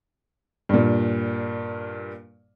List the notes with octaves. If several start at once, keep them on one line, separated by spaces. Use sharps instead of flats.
G2 A#2